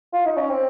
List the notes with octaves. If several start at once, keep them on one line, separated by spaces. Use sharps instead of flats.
F4
D#4
C#4
C4